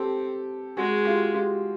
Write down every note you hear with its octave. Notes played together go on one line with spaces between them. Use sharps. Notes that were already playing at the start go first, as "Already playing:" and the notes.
Already playing: C4 G4 A4
G#3 F#4 G#4
F4 G4
F4 G4